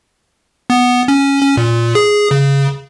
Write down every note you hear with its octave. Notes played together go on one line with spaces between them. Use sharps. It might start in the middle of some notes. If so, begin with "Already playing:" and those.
B3
C#4
C#4
A#2
G#4
C#3